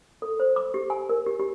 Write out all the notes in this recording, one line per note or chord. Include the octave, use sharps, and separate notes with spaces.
A4
C5
D6
G4
G#5
A#4
G4
G4